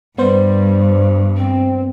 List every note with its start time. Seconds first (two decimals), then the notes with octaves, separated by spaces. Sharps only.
0.18 G2 G3 B3 C5
1.37 C4